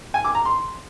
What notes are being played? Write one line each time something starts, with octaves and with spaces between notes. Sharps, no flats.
G#5
D6
A#5
C6